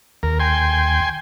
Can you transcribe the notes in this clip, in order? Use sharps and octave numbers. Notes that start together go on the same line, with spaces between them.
D#2 A#4
G5 G#5 C6